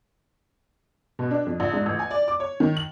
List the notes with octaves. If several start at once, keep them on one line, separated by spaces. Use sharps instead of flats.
B2
D4
F2
A#1
G#2
A1
G#5
D5
D6
C#5
D#3
F#7